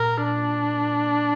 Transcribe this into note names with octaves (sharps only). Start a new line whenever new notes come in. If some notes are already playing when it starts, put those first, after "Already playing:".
Already playing: A#2 A#4
D4